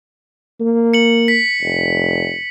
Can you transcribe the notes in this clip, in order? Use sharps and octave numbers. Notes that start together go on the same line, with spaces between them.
A#3
C#7 F#7
B6
F1